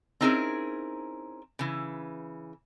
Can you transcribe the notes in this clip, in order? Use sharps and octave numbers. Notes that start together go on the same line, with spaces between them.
C4 C#4 D#4 E4 G#4 A#4
C#3 E3